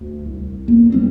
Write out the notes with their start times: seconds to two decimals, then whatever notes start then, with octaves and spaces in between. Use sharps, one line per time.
0.01 D2
0.26 C2
0.68 E2 A#3
0.92 G3 B3 C4